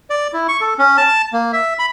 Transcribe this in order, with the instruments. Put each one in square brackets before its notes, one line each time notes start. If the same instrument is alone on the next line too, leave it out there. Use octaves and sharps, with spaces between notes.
[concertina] D5
E4
C#6
A4
C#4
A5
A#3
E5
B5